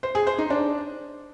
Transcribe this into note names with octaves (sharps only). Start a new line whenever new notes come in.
C5
G#4
C5
D#4
D4